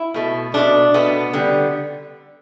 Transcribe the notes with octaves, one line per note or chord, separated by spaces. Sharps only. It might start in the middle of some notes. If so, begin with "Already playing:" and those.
Already playing: E4
B2 A3
B2 A3 D4
B2 A3 B3
D3 G3